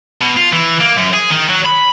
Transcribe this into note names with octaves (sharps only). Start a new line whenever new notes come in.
B2
F4
E3
A#3
F#2
G#4
D#3
F#3
B5